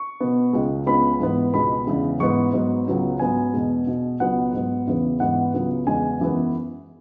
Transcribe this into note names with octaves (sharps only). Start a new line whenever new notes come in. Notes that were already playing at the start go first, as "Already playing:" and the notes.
Already playing: C#6
B2 B3
C#2 C#3 G#3
C#2 C#3 G#3 B3 B5
G#2 E3 B3
C#2 B2 G#3 B3 B5
E2 C#3 E3 G#3
G#2 E3 G#3 B3 C#6
G#2 F#3 B3
C#2 C#3 F#3 B3
G#2 F#3 B3 G#5
E2 B2 G#3
B2 B3
C#2 B2 F#3 B3 F#5
G#2 F#3 B3
E2 C#3 E3 B3
G#2 E3 B3 F#5
C#2 C#3 F#3 B3
E2 C#3 G#3 G#5
F#2 E3 G#3 B3